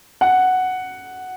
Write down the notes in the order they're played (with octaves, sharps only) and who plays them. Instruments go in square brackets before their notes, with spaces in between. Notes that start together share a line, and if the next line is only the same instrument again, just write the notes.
[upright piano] F#5